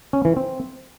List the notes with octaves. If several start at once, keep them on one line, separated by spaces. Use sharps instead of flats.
C#4
E3
C4